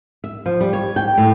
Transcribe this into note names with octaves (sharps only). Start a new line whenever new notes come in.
E5
F3
G3
C#5
G5
A2